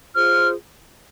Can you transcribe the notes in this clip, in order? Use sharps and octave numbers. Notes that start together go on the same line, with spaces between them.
F4 G#4 C5 F6